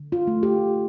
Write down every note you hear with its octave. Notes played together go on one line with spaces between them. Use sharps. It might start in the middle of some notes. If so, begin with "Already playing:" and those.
Already playing: D3
F4
A3
G4